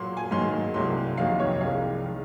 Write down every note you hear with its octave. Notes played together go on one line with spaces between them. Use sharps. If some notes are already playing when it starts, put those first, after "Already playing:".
Already playing: A#2 F#3 A#3 C6
G#5
G#2 D#3 F#3 A#3 C6
C2 C3 F#3 A#3 C6
F2 C3 D#3 F#3 A#3 F5
C#5
C2 C3 F3 G#3 F5
D#3 G#3